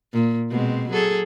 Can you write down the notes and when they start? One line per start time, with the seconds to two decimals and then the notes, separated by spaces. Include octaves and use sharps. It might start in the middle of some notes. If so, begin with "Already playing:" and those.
0.13 A#2
0.50 B2 G#3 C4
0.90 F#3 G#4 A4